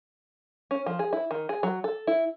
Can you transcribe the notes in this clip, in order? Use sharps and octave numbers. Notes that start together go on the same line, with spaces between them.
C#4
F3
G#4
E4
D#3
G#4
F#3
A4
E4